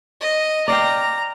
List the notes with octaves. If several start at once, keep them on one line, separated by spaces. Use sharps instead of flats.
D#5
D5 F5 G5 A#5